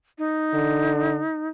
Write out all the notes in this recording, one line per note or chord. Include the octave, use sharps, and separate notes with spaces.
D#4
D3